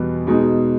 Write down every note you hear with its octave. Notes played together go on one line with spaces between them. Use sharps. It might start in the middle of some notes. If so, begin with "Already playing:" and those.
Already playing: E2 B2 G3 B3
B2 G#3 D#4